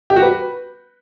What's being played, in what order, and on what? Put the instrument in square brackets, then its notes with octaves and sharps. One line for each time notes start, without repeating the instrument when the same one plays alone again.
[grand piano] G4
F#4
B4